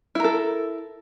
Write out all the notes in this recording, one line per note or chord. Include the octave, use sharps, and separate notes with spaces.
E4 A4 A#4